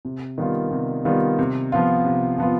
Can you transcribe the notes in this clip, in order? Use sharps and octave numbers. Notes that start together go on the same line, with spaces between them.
C3
D#3 G3 B3 F4
C3
D#3 G3 B3 F4
C3
F3 B3 F4
C3
F3 B3 F4